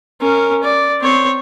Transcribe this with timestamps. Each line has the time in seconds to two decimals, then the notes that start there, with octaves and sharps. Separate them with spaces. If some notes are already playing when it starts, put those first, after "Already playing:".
0.21 C#4 A#4
0.64 D5
1.01 C4 C#5